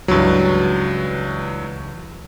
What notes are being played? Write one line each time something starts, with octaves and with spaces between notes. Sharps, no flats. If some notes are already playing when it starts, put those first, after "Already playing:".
C#2 G2 E3 F#3 A6